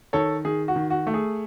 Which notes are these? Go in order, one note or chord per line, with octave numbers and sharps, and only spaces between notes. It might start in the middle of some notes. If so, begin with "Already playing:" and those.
D#3 A4 C#5
D#3 G#4
F#4
D#3
F#4
A3
G#4